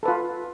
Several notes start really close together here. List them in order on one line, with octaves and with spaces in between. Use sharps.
A4 B4 F4